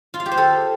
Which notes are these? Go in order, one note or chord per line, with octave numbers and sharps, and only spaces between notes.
F4
F5
G4
C5
A4